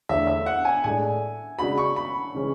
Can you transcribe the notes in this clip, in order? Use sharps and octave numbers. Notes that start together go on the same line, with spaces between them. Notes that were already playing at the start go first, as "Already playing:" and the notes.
E2 D3 A3 E4 E5
E5
F#5
G#5
A2 G#3 D4 A4 G#5
C#3 G#3 D4 F#4 B5
C#6
B5
C#3 E3 G#3 C#4